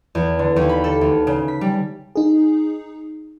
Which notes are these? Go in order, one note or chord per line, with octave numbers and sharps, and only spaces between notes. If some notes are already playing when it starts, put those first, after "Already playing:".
E2
D3
D#2
B5
A4
D2
C#3
B6
G3
D#4 G#4